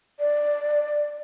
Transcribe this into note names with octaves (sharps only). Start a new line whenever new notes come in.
D5